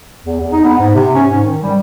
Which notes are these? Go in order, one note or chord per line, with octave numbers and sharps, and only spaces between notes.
E2
E2
D#4
B3
G#2
C3
C#4
G#2
D#3
G3